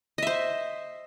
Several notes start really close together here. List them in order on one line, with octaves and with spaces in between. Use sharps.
D#5 E5 C5